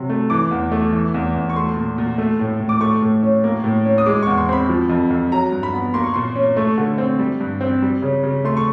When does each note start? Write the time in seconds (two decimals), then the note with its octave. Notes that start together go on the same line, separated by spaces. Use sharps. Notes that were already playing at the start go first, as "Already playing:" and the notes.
Already playing: C3 F#3
0.10 A3
0.30 E3 D6
0.51 E2
0.72 A3
0.93 E3
1.14 E2
1.34 E2
1.50 C#6
1.56 A3 C6
1.76 A#2
1.98 A#2
2.18 A3
2.39 A2
2.60 A2
2.69 D6
2.81 A3 C#6
3.02 A2
3.23 C#4
3.44 A#3
3.64 A2
3.85 C#4
3.98 D#6
4.06 G#3 D6
4.22 E2 C#6
4.38 C6
4.49 C4 C6
4.53 B5
4.69 F3
4.89 F2
5.10 F2
5.31 F#3 A#5
5.52 G2
5.63 B5
5.74 B3
5.94 A#3 C6
6.03 C#6
6.14 A#2 C6
6.36 C#4
6.57 A3 C#6
6.78 D3
6.98 C4
7.19 G3
7.40 G2
7.61 C4
7.82 G3
8.02 C#3
8.23 C#3
8.45 A3 C6
8.57 C#6